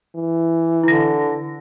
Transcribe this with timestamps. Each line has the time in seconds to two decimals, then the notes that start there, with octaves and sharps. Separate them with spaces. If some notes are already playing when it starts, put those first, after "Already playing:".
0.15 E3
0.84 D3 E4 A#6